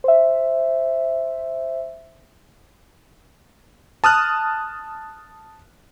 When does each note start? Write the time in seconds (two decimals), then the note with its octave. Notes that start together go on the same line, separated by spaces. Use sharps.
0.04 C5 E5
4.04 A5 D#6 F6 F#6